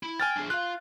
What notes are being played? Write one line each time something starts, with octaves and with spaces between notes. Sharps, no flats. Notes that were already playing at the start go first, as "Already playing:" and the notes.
E4
G5 G#5 F6 A6
D4 G#4
F4 F5 F#6